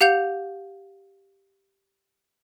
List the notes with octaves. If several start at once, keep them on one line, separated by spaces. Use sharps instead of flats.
G4 F5 F#5 G6 F7